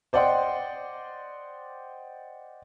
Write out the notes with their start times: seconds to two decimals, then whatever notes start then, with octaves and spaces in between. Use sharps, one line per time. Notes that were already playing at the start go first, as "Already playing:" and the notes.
0.13 C5 D5 D#5 F#5 G5 C6